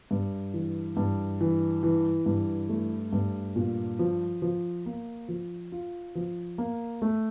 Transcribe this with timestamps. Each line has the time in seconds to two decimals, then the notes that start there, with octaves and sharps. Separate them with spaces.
0.11 G2
0.54 E3
0.97 G2
1.41 E3
1.83 E3
2.26 G2
2.69 A3
3.13 G2
3.56 A#2
3.99 F3
4.42 F3
4.86 A#3
5.28 F3
5.72 F4
6.15 F3
6.58 A#3
7.02 A3